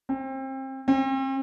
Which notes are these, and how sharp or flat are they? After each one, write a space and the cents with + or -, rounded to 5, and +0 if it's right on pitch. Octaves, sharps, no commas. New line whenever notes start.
C4 +30
C4 +40